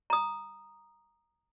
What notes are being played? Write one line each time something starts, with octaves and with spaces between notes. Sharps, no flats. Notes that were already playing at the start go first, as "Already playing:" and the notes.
A#5 D#6